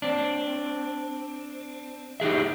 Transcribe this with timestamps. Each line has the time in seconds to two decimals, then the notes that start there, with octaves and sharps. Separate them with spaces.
0.02 C4 D4
2.20 D#4 G4 G#4 E5